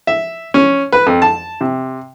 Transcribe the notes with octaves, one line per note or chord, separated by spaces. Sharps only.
E5
C#4
B4
F2
A5
C3